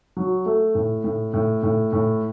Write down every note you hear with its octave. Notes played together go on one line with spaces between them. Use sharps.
F#3
A3
A2
A2
A2
A2
A2